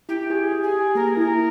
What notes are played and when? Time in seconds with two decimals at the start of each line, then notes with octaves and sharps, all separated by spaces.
0.09 E4 G4
0.30 G4 G#4
0.52 G4
0.63 G#4
0.73 G4
0.95 A#3 A#4
1.08 G#4
1.17 E4 A#4